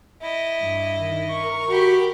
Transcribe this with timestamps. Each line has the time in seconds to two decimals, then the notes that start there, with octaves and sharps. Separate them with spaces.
0.21 E4 D#5
0.60 G2
0.96 D#3
1.29 A#4 C#6
1.69 F#4 G4 B5